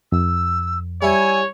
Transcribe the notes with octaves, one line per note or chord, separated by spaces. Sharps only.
F2 E6
G3 E4 C#5 G#5